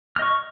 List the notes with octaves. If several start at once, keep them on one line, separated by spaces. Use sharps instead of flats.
D#5 C#6 F6